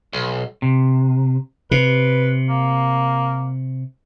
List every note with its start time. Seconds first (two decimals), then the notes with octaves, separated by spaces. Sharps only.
0.13 B1
0.62 C3
1.71 C3 B4
2.49 A#3